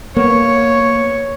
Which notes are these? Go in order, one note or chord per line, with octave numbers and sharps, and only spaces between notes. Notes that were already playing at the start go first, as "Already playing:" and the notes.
A#3 B3 C#5